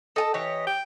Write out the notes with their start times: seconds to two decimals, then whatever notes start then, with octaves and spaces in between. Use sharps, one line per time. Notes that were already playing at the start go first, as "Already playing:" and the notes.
0.16 A4 D#5 G#5 A5
0.34 E3 G4 C#5 D#5
0.66 G5